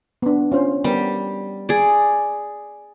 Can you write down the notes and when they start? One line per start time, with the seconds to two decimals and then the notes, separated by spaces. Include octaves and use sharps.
0.22 B3 D4
0.52 C#4 F4 C5
0.84 G3 B3 G4 A#4
1.69 G#4 D5